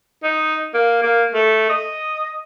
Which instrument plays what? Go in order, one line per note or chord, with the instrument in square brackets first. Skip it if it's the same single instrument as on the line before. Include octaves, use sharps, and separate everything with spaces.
[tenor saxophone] D#4
A#3
A#3
A3
D#5